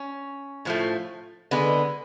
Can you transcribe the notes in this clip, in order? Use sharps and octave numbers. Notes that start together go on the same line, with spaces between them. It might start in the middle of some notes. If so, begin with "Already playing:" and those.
Already playing: C#4
A2 F3 A3
D3 G#3 B3